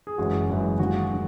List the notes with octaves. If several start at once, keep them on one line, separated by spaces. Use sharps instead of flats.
G#4
F#1 F#2 E3 G#3 F#4
F#1 F#2 E3 G#3
D#2 D#3 G#3 F#4
D#3